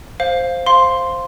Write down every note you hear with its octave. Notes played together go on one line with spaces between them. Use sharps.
C5 F5
C5 F5 C6